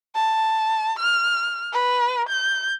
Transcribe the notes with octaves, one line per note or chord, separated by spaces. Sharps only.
A5
F6
B4
G6